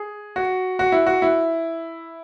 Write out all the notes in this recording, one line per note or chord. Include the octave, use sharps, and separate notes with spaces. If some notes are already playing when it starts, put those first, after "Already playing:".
Already playing: G#4
F#4
F#4
E4
F#4
E4